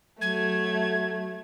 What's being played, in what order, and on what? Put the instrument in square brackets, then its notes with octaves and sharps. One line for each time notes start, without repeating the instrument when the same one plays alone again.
[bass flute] F#3 [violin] A3 [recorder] G#6